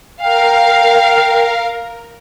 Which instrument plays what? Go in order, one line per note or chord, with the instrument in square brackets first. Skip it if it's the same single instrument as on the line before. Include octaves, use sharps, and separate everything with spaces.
[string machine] A#4 [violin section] F5 [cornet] G5